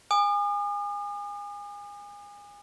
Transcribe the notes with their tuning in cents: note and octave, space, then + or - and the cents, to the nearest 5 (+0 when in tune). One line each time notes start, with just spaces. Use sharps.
G#5 -25 D#6 -45